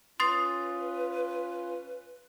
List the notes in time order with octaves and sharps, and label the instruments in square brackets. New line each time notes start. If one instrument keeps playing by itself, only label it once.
[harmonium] C#4 F4 [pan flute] B4 [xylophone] C6 A6 C7 [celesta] D#6